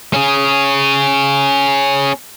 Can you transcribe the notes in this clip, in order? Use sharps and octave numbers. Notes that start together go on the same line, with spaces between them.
C#4 G#4